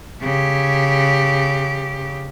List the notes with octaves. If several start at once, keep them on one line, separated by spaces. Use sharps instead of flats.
C#3 G4